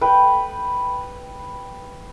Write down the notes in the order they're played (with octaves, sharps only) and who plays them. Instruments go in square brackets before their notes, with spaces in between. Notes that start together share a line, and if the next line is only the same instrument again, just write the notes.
[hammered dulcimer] B4 G5